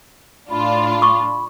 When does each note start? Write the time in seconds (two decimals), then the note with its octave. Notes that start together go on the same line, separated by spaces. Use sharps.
0.50 A2 D4 F4 B5
1.02 C#6 D6